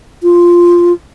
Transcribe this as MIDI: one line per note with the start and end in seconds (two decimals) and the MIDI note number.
0.23 0.93 65